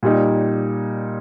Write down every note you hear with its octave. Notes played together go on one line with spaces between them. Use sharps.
A#2 G3 D#4